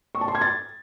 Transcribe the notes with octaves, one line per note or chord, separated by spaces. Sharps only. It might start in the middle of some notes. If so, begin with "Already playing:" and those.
C#6
A5
C6
G#6
A6